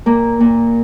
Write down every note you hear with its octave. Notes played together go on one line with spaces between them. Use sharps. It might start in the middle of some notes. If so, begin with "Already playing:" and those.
A#2 A#3
A#2